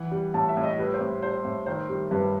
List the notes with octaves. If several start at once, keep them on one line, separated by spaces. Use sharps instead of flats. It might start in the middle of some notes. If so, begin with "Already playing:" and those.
Already playing: E3 F#5
G3
A2 A5
E5
A2
D#5
G3 B4
C5
A2
G3 C5
A2
D#3 C5
G3
G2 B4